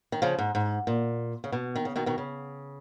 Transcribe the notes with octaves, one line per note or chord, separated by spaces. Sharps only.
D#3
C#3 F3
G#2
G#2
A#2
C#3
B2
D#3
C#3
B2 D#3
B2 D#3
C#3